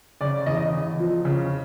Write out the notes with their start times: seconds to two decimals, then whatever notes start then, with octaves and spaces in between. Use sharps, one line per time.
0.21 C#3 D5
0.46 E2 D#5
0.73 E2
0.99 F3
1.25 C#3